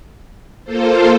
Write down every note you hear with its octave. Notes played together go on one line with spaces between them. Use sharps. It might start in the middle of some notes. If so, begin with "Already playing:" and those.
A#3 F4 A4 C5